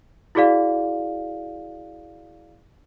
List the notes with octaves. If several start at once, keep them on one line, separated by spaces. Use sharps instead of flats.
E4 F#4 G#4 D5 F5